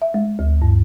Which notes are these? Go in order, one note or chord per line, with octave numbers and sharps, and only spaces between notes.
E5
G#3
D2
G2